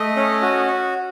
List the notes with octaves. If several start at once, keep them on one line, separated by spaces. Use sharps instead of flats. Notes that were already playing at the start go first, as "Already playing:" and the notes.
Already playing: A3 D#5
C#4
F#4